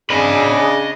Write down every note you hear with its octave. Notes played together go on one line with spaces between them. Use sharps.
C#3 D4 G#4 D#5 B5